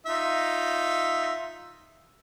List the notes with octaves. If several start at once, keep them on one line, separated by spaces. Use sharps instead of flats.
D#4 F4 E5